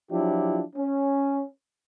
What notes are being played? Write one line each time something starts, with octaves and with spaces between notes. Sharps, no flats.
F3 F#3 D4 E4 F4 G4
C#4